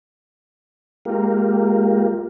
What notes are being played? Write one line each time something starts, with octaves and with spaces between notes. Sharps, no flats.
G#3 A#3 F4 G4 A#4